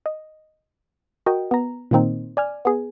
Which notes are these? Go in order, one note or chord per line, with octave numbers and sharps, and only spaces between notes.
D#5
F#4 A#4 D#5 G5
B3 A#5
A#2 D#3 A#3 C4 D#4
D5 G#5 F6
B3 G#4